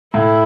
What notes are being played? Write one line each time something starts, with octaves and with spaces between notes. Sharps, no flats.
A2 E4